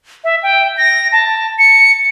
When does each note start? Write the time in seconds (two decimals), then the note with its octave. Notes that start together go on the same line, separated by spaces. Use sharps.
0.24 E5
0.43 G5
0.77 A#6
1.12 A5
1.59 C#7